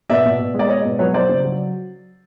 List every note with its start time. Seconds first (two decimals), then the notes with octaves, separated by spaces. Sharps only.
0.10 B2 D5 E5
0.25 B2
0.39 B2
0.54 G#3
0.59 D5
0.69 G#3 C#5 D#5
0.84 B2
0.99 F#3 B4 C#5
1.14 F#3 C5 D5
1.29 C#3
1.45 F#3